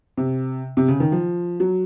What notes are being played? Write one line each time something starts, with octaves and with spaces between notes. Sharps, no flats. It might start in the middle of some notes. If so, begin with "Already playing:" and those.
C3
C3
C#3
D#3
F3
F#3